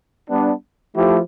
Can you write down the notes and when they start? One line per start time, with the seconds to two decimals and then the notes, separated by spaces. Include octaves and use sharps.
0.29 G3 B3 D4
0.95 F3 A3 E4 G4